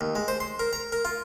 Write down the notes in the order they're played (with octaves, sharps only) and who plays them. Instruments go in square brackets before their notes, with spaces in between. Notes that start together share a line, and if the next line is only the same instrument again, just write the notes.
[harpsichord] D#2
G#3
C5
C6
A#4
A#5
A#4
F4